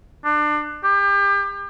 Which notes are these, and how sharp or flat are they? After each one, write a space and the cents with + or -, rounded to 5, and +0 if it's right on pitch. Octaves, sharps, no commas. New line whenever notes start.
D4 +25
G4 +30